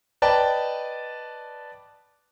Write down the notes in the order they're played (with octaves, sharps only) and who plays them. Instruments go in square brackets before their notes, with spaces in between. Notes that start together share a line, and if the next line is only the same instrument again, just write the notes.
[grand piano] B4 D5 D#5 G5 A5